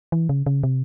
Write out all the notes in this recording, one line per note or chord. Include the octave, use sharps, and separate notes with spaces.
E3
C#3
C#3
C3